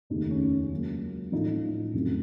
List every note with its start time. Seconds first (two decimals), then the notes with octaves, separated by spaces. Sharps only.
0.10 F1 D#2 C#3 A3 D#4
0.31 C#4
0.70 C#2 C#3 F#3 A#3
1.32 A1 A2 F3 A3 D#4
1.93 F1 F2 C#3 F#3 A3